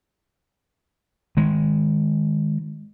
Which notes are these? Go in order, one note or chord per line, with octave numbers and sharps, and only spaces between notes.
D#3 G#3